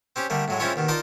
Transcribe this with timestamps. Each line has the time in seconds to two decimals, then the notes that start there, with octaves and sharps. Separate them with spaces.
0.16 C4 C#4 G4
0.30 D3 G3 A3 A#3
0.48 A2 F#3 G#3
0.60 G#3 C4 C#4 E4 F4 C#5
0.76 D#2 B2 D#3
0.88 D#4 F4 A#4 D5 D#5 A5